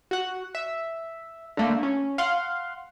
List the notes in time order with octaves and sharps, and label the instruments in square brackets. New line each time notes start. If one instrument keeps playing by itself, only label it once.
[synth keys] F#4 F#5
E5
D3 A3 A#3
C#4
F5 F#5 C6